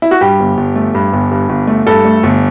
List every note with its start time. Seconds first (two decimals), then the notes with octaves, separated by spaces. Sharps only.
0.02 E4
0.11 F#4
0.21 G2 G4
0.40 G1
0.57 G1
0.76 A3
0.95 G2
1.13 G1
1.31 G2
1.49 G1
1.67 A3
1.87 G2 A4
2.05 A3
2.23 G1